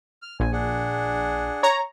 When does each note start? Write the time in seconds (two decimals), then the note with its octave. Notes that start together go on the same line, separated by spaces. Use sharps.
0.22 F6
0.40 A#1 G#5
0.52 D4 G#4 F#5
1.63 C#5 A#5